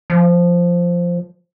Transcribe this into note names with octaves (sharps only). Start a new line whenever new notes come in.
F3